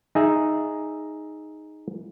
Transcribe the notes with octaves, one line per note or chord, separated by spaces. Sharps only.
D#4 G#4 E5